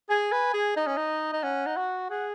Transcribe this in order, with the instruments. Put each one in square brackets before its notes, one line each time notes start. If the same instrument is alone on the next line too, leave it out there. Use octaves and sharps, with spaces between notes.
[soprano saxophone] G#4 [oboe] G#5
[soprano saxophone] B4
G#4
[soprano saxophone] D#4 [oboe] D#5
[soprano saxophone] C#4
D#4
D#4
[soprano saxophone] C#4 [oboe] F#5
[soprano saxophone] D#4
F#4
[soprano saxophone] G#4 [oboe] F#5